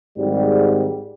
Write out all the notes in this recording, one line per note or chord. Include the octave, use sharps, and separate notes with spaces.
G#1 G#2 G3